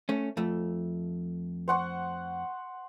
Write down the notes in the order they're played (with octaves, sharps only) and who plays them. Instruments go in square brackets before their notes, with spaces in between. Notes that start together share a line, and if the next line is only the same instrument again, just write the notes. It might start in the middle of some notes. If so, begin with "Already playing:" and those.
[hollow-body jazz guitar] A3 C#4
F2 A3
[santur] C5 F#5 C#6